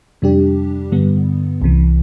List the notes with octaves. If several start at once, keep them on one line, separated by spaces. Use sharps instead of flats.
F2 C3 G3 D4 G4
G2 D3 G3 B3
C2 C3 E3